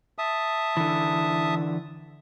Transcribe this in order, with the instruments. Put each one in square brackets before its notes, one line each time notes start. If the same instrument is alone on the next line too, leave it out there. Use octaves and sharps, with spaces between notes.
[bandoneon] E5 A5 D#6
[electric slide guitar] D3 E3